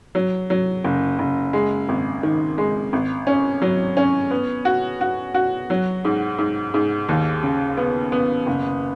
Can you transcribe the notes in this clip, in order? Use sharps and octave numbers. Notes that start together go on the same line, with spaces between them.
F#3
F#3
F#1
F#1
G#3
G#1
D#3
G#3
G#1
C#4
F#3
C#4
B3
F#4
F#4
F#4
F#3
G#2
G#2
G#2
D#2
C#3
B3
B3
F#1